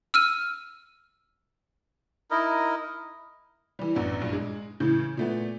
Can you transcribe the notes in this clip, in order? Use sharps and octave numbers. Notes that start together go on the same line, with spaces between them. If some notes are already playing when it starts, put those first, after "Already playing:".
E6 F6 D#7
D#4 E4 A#4 D#5
E3 G3
A1 F#2 B3 D4
A#1 G2
G#3
A2 C#3 E3 G6
A#2 A3 B3